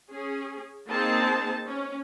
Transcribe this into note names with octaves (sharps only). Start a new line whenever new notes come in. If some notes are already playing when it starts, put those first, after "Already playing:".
C#4 G#4
A#3 C4 D#4 G#4 C5 A5
C#4